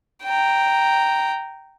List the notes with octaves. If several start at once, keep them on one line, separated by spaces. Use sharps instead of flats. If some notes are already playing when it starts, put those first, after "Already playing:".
G5 A#5